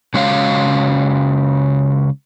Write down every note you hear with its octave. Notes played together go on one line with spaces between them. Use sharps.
C#3 G#3 F#4 C#5 F5